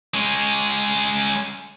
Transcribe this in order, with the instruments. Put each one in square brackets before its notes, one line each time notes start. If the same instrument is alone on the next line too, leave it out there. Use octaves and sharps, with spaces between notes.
[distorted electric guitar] G#3 C#4